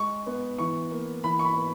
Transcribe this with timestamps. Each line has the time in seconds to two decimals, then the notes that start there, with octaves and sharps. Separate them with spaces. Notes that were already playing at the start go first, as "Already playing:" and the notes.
Already playing: G#3 C#6
0.26 B3
0.58 E3 C#6
0.91 A#3
1.24 E3 B5
1.39 C#6
1.45 B5
1.57 B3